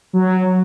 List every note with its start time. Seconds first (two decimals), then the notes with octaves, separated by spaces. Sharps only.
0.13 F#3